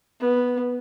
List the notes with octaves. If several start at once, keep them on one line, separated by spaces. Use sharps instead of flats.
B3